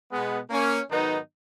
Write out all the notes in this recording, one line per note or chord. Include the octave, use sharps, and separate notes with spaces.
B2 G#3 B3
A#3 C#4
G#2 D#3 F#3 B3 D#4